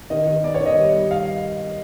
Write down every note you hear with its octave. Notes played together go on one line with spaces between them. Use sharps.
D#3 D#5
D#3
B3 D5
C#5
D#3
D#5
G3
G3
F5